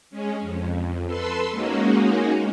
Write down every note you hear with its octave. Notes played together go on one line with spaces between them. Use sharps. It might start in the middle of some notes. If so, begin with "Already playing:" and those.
G#3 C#4
F2
A4 B4 C6 E6
G#3 A#3 C#4 D#4 F#4